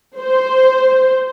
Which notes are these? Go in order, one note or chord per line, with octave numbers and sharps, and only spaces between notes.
C5